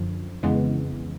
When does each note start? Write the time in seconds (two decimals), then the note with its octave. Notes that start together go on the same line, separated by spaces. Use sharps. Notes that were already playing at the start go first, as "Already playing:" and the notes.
Already playing: F#2 D3 F3
0.43 F2 C#3 E3 G#3 B3